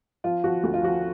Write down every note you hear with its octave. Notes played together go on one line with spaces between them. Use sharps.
F3 F4
F3 F#4
D2 F#4
F4
F3 F#4